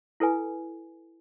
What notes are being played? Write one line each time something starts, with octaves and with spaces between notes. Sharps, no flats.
E4 A4 B4 G#5